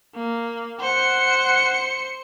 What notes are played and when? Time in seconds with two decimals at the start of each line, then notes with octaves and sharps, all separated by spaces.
0.15 A#3
0.80 C5 F#5 C#7